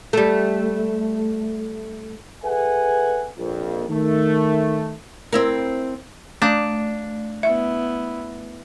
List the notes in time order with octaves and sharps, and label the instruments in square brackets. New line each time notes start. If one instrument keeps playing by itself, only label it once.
[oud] G3 A3
[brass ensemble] G#4 A4 B4 E5 F#5 G#5
A#1 F2
D#3 A3
[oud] C4 E4 A#4
[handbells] A3 F5 [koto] D4
[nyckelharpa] B3 E4 [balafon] E5